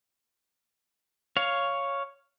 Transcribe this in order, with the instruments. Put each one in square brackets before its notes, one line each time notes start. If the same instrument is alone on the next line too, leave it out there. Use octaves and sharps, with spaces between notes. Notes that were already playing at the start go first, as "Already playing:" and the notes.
[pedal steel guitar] C#5 F5